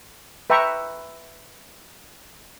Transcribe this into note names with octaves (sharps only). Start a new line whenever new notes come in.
B4 E5 G5 A#5 C#6